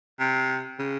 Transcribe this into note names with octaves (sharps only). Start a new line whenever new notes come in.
C3
C#3